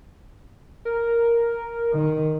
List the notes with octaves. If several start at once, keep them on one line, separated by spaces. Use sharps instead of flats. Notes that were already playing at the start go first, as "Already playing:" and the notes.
A#4
D#3